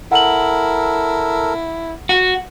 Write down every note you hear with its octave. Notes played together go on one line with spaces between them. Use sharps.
E4 A4 A#4 F#5 F#7
F#4